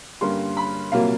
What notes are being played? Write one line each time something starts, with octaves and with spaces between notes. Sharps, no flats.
G2 D3 G3 A#3 C#4 C6
B5
C2 A#2 F#3 A#3 F5